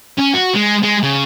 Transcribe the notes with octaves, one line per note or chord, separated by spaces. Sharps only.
C#4
F#4
G#3
G#3
C#3